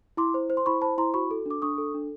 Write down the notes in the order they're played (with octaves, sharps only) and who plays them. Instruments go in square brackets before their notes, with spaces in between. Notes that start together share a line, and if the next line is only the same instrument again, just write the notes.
[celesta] E4 C6 D6
C5
C5
C6
E4 B5 C#6
C5 A5 B5
E4 A#5 C6
F#4 B5 C#6
A4
D4 D6
D4 C#6 D#6
A4
D4